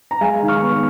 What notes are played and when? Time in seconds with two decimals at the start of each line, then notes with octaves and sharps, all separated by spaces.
0.11 A#5
0.21 G#3 F5 G#5
0.42 D#3
0.48 C#6 F6
0.62 B3